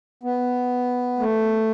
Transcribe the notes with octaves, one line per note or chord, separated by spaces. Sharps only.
B3
A3